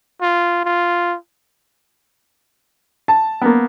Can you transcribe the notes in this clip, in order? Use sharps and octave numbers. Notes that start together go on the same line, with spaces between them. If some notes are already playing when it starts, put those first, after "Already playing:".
F4
F4
A5
A#3 B3